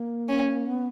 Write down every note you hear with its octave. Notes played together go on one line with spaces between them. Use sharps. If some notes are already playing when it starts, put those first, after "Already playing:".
Already playing: A#3
C#4
B3